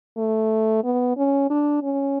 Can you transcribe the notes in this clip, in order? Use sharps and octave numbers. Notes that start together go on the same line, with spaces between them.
A3
B3
C#4
D4
C#4